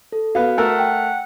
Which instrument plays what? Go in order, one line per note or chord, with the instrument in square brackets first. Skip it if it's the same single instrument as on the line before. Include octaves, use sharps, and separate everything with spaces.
[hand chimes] A4
[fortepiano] B3 F5 [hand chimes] F#4
[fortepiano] A3 A4 A#4 [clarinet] F#5
[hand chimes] G5